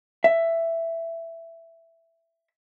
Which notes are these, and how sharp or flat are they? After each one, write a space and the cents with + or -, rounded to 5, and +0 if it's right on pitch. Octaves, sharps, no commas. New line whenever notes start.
E5 +10